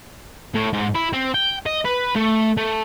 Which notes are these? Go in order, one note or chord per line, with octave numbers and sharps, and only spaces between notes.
A2
G#2
E4
C4
G5
D#5
B4
A3
A3